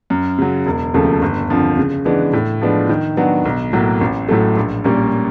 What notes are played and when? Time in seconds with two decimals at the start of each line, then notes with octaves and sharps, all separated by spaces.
0.10 F#2
0.38 C#3 F#3
0.66 E1
0.94 D#2 C#3 F3 A3
1.22 G1
1.50 F2 D3 F3
1.78 C#3
2.05 E3 G#3 B3 D4
2.33 A2
2.61 F3 G#3 B3 D4
2.89 D#3
3.17 F#3 B3 D4 F#4
3.45 B1
3.73 A2 F#3 A#3
4.01 A1
4.29 A2 F#3 A3
4.57 A#1
4.84 A#2 G3 A#3 C#4